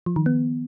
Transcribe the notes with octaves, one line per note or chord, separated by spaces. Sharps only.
F3
D#3
B3